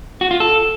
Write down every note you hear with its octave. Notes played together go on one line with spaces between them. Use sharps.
F#4
F4
A4